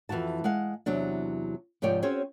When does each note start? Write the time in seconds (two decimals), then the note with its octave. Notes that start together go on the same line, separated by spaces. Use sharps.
0.09 F2 E3 F4 F#4 A5
0.44 G#3 F5 F#5
0.86 E2 C3 F#3 D4
1.82 G#2 C3 F3 C#5 D5 G5
2.02 C4 C#4 F#4 G#4 C5 C#5